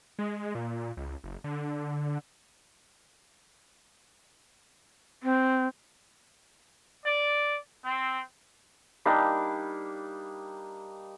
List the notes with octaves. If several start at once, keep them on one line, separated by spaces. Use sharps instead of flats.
G#3
A#2
C#2
F#1
D3
C4
D5
C4
G3 A#3 D4 D#4